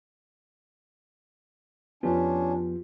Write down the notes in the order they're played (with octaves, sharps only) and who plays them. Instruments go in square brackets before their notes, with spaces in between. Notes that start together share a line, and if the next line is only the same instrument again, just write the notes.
[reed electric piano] F2 F3 B3 [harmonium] C#4 D4 [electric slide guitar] F4 G4